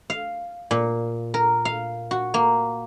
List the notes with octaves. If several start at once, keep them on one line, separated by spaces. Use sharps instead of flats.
F5
A#2
A#4
F5
F#4
A#3